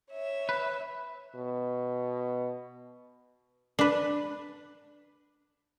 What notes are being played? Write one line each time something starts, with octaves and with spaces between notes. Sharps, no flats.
C#5 E5
B4
B2
D4 B4